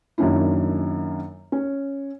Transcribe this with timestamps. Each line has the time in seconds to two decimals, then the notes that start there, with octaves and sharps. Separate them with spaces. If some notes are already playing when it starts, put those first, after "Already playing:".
0.18 F#2 D#3 A#3 C#4 D4 E4
1.52 C#4